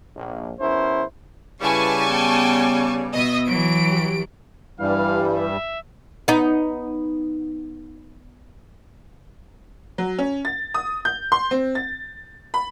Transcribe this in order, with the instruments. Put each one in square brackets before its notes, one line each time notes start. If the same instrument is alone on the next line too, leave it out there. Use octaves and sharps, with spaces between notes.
[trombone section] A#1
E2 C#4 E4 A#4 C5
[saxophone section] C#3 G3 [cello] E4 [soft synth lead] B4 [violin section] G#5 A5 C#6
[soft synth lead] B3 [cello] G5
[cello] B2 [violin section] D#5 E5
[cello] E3 F#3 [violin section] D7
[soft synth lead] G4
[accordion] G2 G3 [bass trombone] E3 [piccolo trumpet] F5
[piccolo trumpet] E5
[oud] B3 D#4
[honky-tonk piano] F#3
C#4
A6
D#6
G6
C6
C4
A6
B5